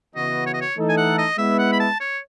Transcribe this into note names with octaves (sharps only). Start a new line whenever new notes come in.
C#3 E3 B3 F#4 D#5
C#5
D#5
C#5
E3 A3 D#4 A4
G#5
F#5
D#5
G#3 B3 E4 E5
F#5
B5
A5
C#5